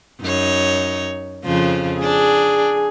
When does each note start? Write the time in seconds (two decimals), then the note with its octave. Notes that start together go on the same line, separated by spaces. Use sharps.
0.21 F#2 D#4 C#5
1.44 F2 C#3 F3
2.02 D4 G#4